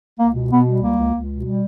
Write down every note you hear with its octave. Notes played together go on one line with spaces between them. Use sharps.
C#2 A#3
B2
B2 B3
G3
C#2 A#3
C#2
C#2
B2
G3